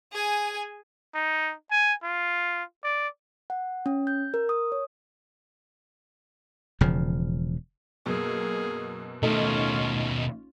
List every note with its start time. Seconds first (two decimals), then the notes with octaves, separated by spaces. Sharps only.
0.12 G#4 G#5
1.14 D#4
1.71 G#5
2.03 F4
2.84 D5
3.50 F#5
3.86 C#4
4.07 G6
4.34 A#4
4.49 D#6
4.72 C#5
6.81 E1 C#3 F3
8.06 F#2 B2 A#3 G#4
9.23 D#2 B2 A3 C#4 D#4 F4